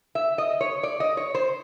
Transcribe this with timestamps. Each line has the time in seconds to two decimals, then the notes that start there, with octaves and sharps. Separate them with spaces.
0.15 E5
0.38 D#5
0.61 C#5
0.83 D5
1.00 D#5
1.17 C#5
1.35 C5